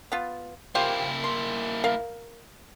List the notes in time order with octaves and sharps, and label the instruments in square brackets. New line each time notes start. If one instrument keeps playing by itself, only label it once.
[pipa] B3 F4
[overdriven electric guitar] A#3 E4 [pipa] F4 G4 C5
[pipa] C6
A#4 F5